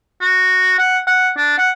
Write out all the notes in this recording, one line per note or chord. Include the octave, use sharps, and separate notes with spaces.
F#4
F#5
F#5
D4
F#5